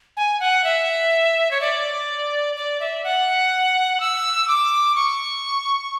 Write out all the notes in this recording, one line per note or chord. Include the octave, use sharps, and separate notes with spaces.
G#5
F#5
E5
C#5
D5
D5
E5
F#5
E6
D6
C#6